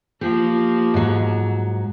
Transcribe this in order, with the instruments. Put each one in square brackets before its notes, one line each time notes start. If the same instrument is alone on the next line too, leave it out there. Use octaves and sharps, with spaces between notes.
[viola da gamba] F3 A#3 [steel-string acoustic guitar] G4
[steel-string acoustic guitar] G#2 F#3